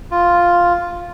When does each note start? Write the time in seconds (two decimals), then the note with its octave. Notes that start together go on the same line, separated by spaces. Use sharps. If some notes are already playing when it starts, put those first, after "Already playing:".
0.11 F4